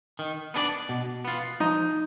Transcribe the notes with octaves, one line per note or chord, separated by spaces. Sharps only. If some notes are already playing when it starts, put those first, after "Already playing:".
D#3
B3 D4 G#4 D5
B2
B3 F4
F3 D#4